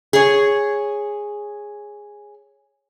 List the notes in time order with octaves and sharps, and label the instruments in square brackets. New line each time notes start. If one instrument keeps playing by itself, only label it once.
[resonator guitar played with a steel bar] G#4 C#5